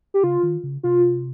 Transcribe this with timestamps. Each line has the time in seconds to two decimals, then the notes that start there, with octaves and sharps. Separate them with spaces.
0.14 G4
0.23 C#3 F4
0.43 D#3
0.63 C#3
0.83 C3 F4